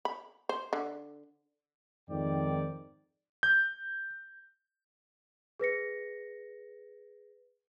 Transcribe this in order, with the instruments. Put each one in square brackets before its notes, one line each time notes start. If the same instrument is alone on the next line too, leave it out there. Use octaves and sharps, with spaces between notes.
[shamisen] B5
C5
D3
[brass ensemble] F2 G#2 D#3 D5 G5
[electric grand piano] G6
[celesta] G#4 B4 A#6 C#7